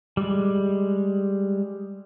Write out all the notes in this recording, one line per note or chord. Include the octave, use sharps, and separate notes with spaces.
G3 G#3